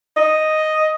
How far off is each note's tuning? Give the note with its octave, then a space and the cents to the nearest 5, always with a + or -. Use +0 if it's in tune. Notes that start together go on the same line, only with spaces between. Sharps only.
D#5 +0